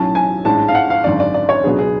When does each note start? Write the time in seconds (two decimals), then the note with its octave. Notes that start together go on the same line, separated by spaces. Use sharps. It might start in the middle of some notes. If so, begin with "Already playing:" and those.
Already playing: B1 A2 F#3 C#4 A5
0.15 G#5
0.45 A1 G#2 G#3 D4 A5
0.68 F5
0.75 F#5
0.90 F5
1.04 G#1 F#2 D3 D5
1.20 D5
1.34 D5
1.49 C#5
1.64 C#2 B2 F#3 B3 D4 G#4
1.79 G#4